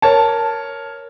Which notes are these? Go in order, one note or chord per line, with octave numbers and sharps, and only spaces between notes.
A#4 C#5 A5